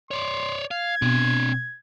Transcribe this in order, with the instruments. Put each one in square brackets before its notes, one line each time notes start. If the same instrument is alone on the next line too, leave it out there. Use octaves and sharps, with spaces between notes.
[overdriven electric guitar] C#5 D5 [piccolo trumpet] C6
[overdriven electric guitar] F5 [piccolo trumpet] G#6
[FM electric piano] B2 [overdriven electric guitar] C4 D4